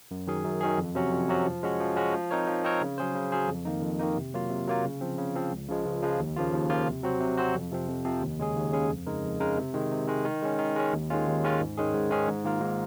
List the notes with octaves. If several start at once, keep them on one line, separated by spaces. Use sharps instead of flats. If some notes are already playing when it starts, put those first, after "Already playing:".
F#2
D#3 F#3 C#4 G#4
F#2
D#3 F#3 C#4 G#4
F2
C3 F#3 C#4 F#4
F2
C3 F#3 C#4 F#4
F3
G#3 C#4 F#4
F3
G#3 C#4 F#4
F3
C4 D#4 A#4 C#5
F3
C4 D#4 A#4 C#5
C#3
F#3 C#4 G#4 C5
C#3
F#3 C#4 G#4 C5
F2
D#3 A#3 D#4
F2
D#3 A#3 D#4
C3
F#3 A#3 F4
C3
F#3 A#3 F4
C#3
F3 C4
C#3
F3 C4
C#2
C#3 F3 G#3
C#2
C#3 F3 G#3
D#2
C#3 F3 A#3 F4
D#2
C#3 F3 A#3 F4
C3
F#3 C4 F#4 C5
C3
F#3 C4 F#4 C5
F2
C3 F3 C4
F2
C3 F3 C4
D#2
C#3 G#3 C#4 G#4
D#2
C#3 G#3 C#4 G#4
F2
C#3 G#3 D#4 A#4
F2
C#3 G#3 D#4 A#4
C3
D#3 G#3
C3
D#3 G#3
D#3
G#3 C#4
D#3
G#3 C#4
D#2
D#3 G#3 C#4 F4
D#2
D#3 G#3 C#4 F4
G#2
D#3 G#3 C#4 G#4
G#2
D#3 G#3 C#4 G#4
G#2
D#3 A#3 F4 A#4
G#2